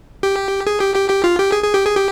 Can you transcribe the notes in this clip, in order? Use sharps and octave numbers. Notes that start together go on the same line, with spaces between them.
G4
G#4
G4
G4
G4
F4
G4
G#4
G#4
G4
G#4
G4